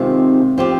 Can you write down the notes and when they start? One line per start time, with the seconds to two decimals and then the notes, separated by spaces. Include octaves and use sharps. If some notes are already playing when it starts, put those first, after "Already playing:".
Already playing: C3 D#3 G#3 C4 F4
0.58 F3 C4 G4